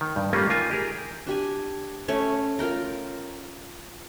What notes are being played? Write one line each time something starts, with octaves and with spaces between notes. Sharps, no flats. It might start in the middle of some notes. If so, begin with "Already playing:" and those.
D#3
G2
G3 A3 A#3 C#4 F4 B4
D#3 A#3 F4 G#5
G4 G#4 A#4
D4 G4 G#5
A3 C#4 C#5
F4 A#4 G5 A#5